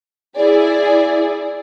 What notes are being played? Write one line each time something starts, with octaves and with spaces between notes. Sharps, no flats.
E4 G#4 D5